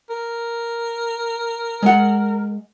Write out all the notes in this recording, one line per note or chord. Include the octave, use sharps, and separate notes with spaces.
A#4
G#3 F#5